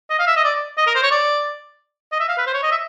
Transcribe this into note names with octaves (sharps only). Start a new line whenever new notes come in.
D#5
F5
E5
D#5
D5
D#5
A#4
C5
C#5
D5
D#5
E5
F5
B4
C5
C#5
D#5
E5